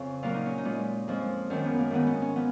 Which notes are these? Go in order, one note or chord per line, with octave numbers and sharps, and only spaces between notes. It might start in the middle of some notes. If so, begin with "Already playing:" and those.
Already playing: F2 C#3
A#2 F#3 A#3 F4
D#4
C#4
D#4
A#2 G#3
F2 F3 G#3
F#2 D#3 A#3 C#4
B3
A#3
G#2 D#3 A#3 B3
C#4
C#4
F3 B3